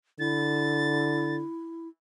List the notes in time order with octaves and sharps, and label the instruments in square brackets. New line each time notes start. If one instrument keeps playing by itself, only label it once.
[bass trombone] D3 [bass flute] E4 [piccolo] A6